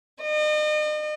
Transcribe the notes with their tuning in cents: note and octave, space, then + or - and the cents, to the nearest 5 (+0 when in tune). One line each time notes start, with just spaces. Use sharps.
D#5 -40